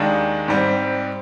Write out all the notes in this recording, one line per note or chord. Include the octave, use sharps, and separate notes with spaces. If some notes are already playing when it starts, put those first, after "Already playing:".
Already playing: D#2 D#3 G#3 D4
G#2 G3 C4